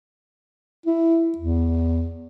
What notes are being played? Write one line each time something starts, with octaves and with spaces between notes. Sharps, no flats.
E4
E2